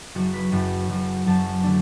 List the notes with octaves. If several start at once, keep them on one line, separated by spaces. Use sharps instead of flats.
F#1 F#2 F#3 F#4
B4
F#1 F#2 F#3 B5
F#1 F#2 F#3
F#1 F#2 F#3 A5
D3 A3 D4